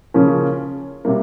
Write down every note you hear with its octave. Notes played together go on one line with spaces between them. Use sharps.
C#3 F3 A#3 C#4
C3 G3 A#3